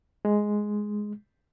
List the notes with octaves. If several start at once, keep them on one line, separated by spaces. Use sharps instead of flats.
G#3